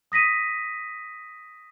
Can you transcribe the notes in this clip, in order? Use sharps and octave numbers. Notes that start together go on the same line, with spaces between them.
D#6 A#6 B6 D#7